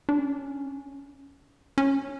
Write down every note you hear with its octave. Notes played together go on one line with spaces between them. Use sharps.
D4
C#4
C#4